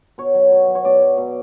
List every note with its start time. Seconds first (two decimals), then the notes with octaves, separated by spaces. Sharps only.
0.18 B2 C#5
0.34 F#3
0.52 B2
0.67 F#3
0.75 C#5
0.85 B2 D5
1.02 F#3
1.17 B2